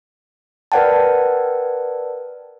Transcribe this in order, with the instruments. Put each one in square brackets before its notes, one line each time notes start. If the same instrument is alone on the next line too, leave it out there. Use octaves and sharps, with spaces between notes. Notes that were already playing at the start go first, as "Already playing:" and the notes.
[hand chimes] A#4 B4 D5 F#5 G5 A5